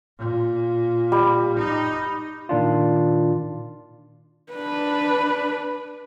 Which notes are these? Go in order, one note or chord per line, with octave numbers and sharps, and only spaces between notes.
A#2
G3
D#4
A#2 D#3 D4 F4
D4 B4